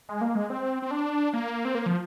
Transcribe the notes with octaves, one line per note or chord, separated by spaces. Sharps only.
G#3
A#3
G#3
C4
C4
D4
A#3
C4
A#3
F3